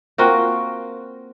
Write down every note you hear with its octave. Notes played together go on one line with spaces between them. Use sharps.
A#3 C4 F4 F#4